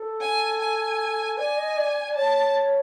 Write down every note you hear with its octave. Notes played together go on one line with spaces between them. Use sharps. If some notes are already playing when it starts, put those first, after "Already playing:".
Already playing: A4
G#5
G#5
D5 G#5
D#5
D5
D5
C#5 A5